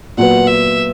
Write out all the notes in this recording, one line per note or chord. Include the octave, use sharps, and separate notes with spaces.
A#2 F#3 B3 F#5
E5